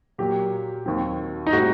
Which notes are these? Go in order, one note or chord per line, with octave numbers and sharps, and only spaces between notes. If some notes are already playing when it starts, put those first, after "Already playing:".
A#2 F#3 A#3 G4
D#2 D#3 F#3 C4
D#4
A2 G3 C4 F#4